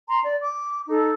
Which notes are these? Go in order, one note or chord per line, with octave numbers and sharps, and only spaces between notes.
A#5 C6
D5
D6
D#4 A4